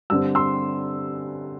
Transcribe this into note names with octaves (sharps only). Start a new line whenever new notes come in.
G2 D3 C4 E6
C6 E6